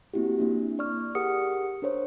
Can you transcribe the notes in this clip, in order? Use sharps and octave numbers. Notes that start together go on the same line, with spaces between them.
A#3 C4 E4 F#4 G4
A#3 D4 E4
D5 C#6 F6
G4 G#4 A#4 F#5 D#6 C#7
D4 A#4 C5 C#5